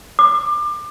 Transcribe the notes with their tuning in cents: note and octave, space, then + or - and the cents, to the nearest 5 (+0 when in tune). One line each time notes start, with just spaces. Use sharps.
D6 +30